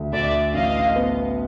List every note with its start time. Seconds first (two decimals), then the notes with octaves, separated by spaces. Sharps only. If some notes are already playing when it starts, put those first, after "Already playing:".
Already playing: D2
0.12 D2 D5 E5
0.54 A1 D#5 F5
0.96 B3